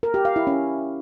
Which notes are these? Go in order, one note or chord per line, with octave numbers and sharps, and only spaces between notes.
A#4
G4
F5
E4
C#4